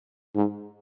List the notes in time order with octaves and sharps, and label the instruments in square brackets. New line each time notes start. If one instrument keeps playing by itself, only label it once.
[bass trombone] G#2